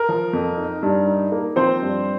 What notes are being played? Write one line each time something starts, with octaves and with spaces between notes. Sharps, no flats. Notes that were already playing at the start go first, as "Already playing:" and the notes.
Already playing: A#4
F3
F2
D#4
G2
D#4
A#3
F3 C4 C5
G2